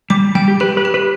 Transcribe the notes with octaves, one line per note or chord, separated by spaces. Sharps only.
G3 D6
G3 G5
G4
G4 B4
B4
G4
B4